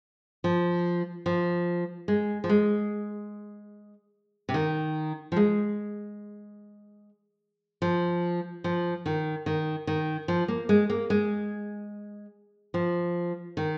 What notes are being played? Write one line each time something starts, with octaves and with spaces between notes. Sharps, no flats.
F3
F3
G#3
F3
G#3
C3
D#3
F3
G#3
F3
F3
D#3
D#3
D#3
F3
A#3
G#3
A#3
G#3
F3
D#3